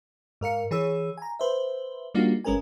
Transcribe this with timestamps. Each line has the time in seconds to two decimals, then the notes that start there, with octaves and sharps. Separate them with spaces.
0.41 G#2 A#4 F5 C#7
0.71 E3 G#4 C#5 E6
1.17 G#5 A#5
1.39 B4 C5 E5
2.14 G3 A#3 D4 D#4 F4 F#4
2.44 G#1 G#3 C#4 A#4 B4 G#5